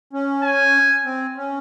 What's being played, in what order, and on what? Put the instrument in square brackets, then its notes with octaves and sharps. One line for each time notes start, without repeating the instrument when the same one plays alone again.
[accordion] C#4
[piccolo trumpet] G#5
[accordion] C4
C#4